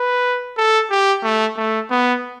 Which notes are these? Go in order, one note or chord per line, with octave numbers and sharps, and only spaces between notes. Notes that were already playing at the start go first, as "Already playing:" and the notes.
Already playing: B4
A4
G4
A3
A3
B3